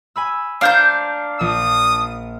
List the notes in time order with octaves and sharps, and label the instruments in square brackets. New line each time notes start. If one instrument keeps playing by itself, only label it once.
[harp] G#5 B5 E6
[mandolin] D4 C5 G6 [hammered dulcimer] F5 A#5
[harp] A#1 [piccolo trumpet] D#6